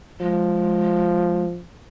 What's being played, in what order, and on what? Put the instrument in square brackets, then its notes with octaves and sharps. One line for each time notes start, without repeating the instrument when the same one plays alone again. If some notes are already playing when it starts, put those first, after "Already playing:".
[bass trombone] F3 [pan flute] G#3